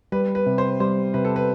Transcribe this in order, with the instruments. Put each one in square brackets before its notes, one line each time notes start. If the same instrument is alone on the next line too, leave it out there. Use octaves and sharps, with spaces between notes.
[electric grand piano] G3 [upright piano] B4
[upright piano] B4
[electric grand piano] C3
[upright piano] C5
[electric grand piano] G3 [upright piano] C5
[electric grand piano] C3 [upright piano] B4
[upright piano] A4
B4